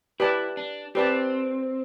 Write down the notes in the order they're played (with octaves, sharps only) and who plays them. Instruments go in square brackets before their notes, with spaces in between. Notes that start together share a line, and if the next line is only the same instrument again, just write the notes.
[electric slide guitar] E4 [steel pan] G4 B4 D5 A5
[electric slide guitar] D4
[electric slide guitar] C4 [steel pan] G4 B4 D5 A5